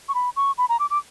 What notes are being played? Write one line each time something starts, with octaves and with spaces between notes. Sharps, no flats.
C#6
B5
C#6
B5
A#5
D6
D6